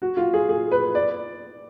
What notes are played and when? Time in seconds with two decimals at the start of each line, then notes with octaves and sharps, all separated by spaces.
0.02 F#4
0.17 F4
0.33 G#4
0.49 G#4
0.71 B4
0.95 D5